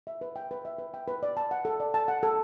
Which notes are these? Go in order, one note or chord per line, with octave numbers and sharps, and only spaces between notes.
E5
B4
G5
B4
E5
B4
G5
B4
D5
A5
F#5
A4
D5
A5
F#5
A4